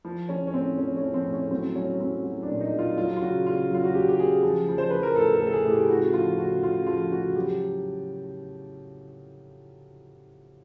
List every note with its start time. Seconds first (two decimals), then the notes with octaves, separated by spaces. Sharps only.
0.05 F3
0.29 F3 C#4
0.47 C#4
0.54 A2 C4
0.78 F3 C#4
0.97 C#4
1.02 F3
1.14 C4
1.27 A2
1.33 C#4
1.51 F#3 C4
1.76 F#3 C#4
2.00 F#3 C4
2.24 F#3
2.43 D4
2.48 A#2
2.61 D#4
2.73 F#3
2.79 F4
2.97 F#3 F4
3.17 F4
3.21 C#3 F#4
3.46 C#3 F4
3.71 F#3 F4
3.84 F#4
3.94 C#3 G4
4.09 G4
4.19 C#3 G#4
4.43 F3
4.68 F3
4.78 C5
4.90 F3 B4
5.03 A#4
5.16 A2 A4
5.35 A4
5.41 A2
5.47 A4
5.53 G#4
5.65 A2
5.71 G4
5.89 C#3 F#4
6.13 F3 F4
6.38 C#3 F#4
6.63 C#3 F4
6.87 F3 F4
7.12 C#3 F#4
7.36 F#3 G4